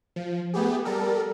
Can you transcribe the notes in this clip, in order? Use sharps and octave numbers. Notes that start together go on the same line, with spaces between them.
F3
A3 B3 G4 G#4
G3 A4 A#4